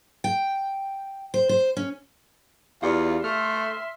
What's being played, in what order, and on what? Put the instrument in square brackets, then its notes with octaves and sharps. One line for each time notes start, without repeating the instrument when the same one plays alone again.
[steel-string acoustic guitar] G5
C5
C5
C#4
[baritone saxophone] E2 [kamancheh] F4 [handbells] G4 D5 F5
[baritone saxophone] A3 [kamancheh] E5 C6 [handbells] F6